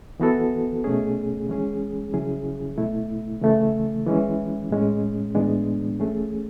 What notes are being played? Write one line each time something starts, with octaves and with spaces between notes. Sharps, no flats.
E3 B3 F#4 A4
B2 A3 C#4 G#4
E3 G#3 C#4 G#4
C#3 F#3 C#4 E4 G#4
B2 A3 E4
C#3 E3 A3
E3 G#3 C#4
A2 G#3 C#4
A2 E3 G#3 B3 D4
E3 A3 C#4 G#4